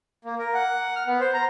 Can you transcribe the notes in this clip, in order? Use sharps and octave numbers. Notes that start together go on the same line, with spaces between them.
A#3
A#4
F#5
F6
B3
C5
A#5